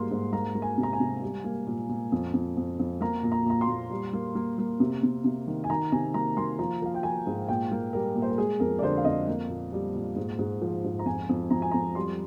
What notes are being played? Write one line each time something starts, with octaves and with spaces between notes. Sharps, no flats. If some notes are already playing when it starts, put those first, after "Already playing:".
Already playing: G#2 G3 A#3 C6
G#2
A#3 A#5
A#3
G#5
C3
A#5
G#5
C3
G3
A#3
A#2
A#2
F2
F2
F2
F2
A#3 A#5
A#2
A#5
A#2 A#5
C6
A#2
G3
A#3
A#3
A#3
C3
C3
C3
D#3
G#5
D#3 A#5
C3 G#5
A#3 A#5
A#3 C6
F3 A#5
F3 F5
G5
F3 G#5
G#2
A#2 G5
A#3
G3 A#4
A#2
C5
A#4
G#3 G#4
F2 A#4
D5
D3 C5
F5
F2 D#5
A#3
A#2
G3
A#2
G#2
G#2
F3
G#2
A#5
F2 G#5
F2
F2 A#5
G#5
F2 A#5
G3 C6